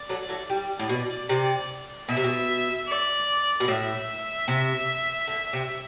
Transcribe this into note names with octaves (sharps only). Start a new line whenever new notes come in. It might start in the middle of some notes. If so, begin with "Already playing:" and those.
Already playing: D5
F#3 A3
F#3 A3
G3 D5
A2
B2
C3
B2 E5
C3
B2
D5
B2
A2 E5
C3
D3
C3